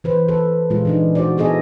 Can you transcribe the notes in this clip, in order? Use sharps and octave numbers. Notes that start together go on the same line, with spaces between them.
E3 B4 C5
A4 B4
A#2 G#3 F4
E3 D4 D#4
F#4 C5 D5
B3 E4 G#4 A4 D#5